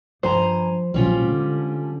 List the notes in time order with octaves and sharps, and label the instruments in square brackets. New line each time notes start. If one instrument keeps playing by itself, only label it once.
[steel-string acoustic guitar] G2 G#5 A#5 [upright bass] F3 [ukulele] C5
[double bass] A#1 [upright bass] B2 F#3 [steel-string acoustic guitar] G3 C#4 F4
[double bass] D3 [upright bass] G#3